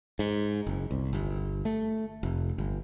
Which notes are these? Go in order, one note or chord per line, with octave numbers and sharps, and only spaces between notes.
G#2
F#1
C2
G1
A3
F1
G1